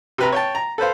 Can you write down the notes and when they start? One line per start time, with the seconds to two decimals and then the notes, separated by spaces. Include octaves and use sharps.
0.18 C3 B4 A#5
0.32 C#5 G5 A5
0.55 A#5
0.78 A4 B4 C5 F5